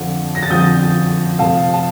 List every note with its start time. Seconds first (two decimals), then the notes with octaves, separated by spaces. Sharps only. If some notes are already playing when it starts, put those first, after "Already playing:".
Already playing: F2 D3 F3
0.35 A#6
0.43 A6
0.50 F2 D3 F3 D#6 G6
1.39 C3 F3 A3 F5 A5
1.73 A5